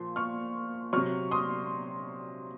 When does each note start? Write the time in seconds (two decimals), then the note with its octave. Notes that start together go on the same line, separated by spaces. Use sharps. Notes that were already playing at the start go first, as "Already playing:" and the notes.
Already playing: A#2 F3 C6
0.16 C#6 F6
0.93 C3 F#3 C#6 F6
1.31 C6 D#6